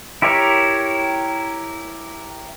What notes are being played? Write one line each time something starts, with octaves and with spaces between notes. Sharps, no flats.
E4 G4 A#4 C#5